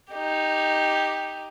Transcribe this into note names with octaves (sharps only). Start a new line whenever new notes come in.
D#4 G4